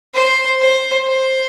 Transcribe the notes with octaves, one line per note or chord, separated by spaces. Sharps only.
C5
C5
C5